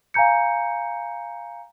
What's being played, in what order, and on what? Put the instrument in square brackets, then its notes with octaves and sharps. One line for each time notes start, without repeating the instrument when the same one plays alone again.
[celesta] F5 G#5 A#5 G6 C#7